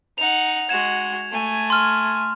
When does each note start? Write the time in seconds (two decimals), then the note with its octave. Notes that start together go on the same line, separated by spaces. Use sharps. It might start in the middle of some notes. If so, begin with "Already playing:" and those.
0.18 D#4 F#5 F7
0.69 G#3 F#4 G#6 E7
1.32 A3 G#5
1.70 C6 F6